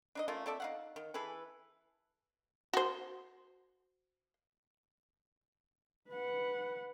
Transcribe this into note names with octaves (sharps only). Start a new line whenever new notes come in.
D4 D#4 D#5
A3 C#4 F4 A#4
C4 A4 D5 E5
D#4 F5 F#5
D#3
E3 G#4 A4 B4
F#4 C5
B4 F#5